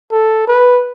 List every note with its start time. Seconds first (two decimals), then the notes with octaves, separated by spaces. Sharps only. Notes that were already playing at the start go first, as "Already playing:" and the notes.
0.12 A4
0.48 B4